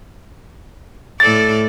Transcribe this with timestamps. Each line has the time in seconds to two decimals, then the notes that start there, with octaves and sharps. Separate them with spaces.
1.20 A2 A4 D5 A6